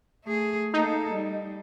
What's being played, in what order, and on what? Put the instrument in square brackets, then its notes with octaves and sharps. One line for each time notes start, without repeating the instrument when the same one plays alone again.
[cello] A3 G#4
[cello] A#3 A4 [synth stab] D#4
[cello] G3